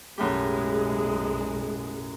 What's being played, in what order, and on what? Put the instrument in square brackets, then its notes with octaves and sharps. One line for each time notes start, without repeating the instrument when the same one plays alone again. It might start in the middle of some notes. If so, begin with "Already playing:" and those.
[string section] B1 G#3 [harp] F#2 A2 G4